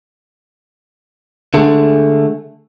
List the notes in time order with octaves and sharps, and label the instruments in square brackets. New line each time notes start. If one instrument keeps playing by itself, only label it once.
[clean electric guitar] D3 G#3 A3